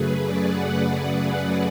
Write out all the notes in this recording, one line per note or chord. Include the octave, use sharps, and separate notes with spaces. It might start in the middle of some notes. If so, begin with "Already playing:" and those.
Already playing: F#2 C#3 F#3 A3 G#4 B4
D5
F#5